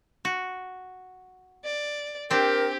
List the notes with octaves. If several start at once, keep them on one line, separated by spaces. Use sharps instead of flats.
F#4
D5
C4 D4 G4 A#4